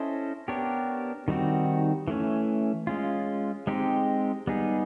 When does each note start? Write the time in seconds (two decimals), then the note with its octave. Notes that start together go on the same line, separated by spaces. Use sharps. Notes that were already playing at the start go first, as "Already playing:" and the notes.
Already playing: C#4 E4 A4 C5 D#5
0.48 B3 D4 G4 A#4 C#5
1.28 D#3 G3 C4 D#4 F#4
2.08 E3 A3 C#4
2.87 G#3 C#4 F4
3.67 G#3 C4 D#4 G4
4.47 G3 B3 D#4 G#4